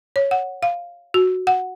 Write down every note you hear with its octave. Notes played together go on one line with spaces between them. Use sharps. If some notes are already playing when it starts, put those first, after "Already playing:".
C#5
F#5
F5
F#4
F#5